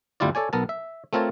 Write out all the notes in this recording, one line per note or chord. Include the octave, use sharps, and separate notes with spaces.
G1 D2 G3 E4 F4 D5
A4 C#5 D5 G#5
B1 B3 A#4 A5
E5
A3 C4 F4 A#4 C#5 A5